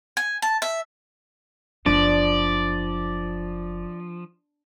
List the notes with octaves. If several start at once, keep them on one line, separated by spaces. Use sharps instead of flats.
G#5
A5
E5
F#1 F3 B3 D4 D5